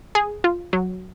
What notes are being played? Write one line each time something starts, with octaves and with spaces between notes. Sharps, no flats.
G#4
F4
F#3